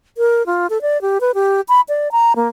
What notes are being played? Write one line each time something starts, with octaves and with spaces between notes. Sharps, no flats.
A#4
F4
A4
D5
G4
B4
G4
B5
D5
A#5
A#3